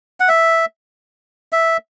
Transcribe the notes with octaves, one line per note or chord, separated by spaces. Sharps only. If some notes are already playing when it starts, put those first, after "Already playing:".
F#5
E5
E5